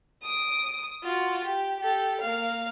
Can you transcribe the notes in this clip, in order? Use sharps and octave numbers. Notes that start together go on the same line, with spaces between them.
D#6 D7
F4 F#4
G4
G4 A4
A#3 F5